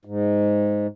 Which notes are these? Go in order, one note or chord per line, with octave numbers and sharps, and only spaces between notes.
G#2